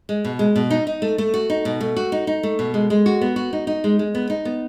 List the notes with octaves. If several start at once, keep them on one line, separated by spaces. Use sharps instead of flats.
G#3
B2
G#3
B2
D#4
D#4
A3
A3
F#4
D#4
B2
A3
F#4
D#4
D#4
A3
B2
G#3
G#3
F#4
B3
F#4
D#4
D#4
G#3
G#3
B3
D#4
B3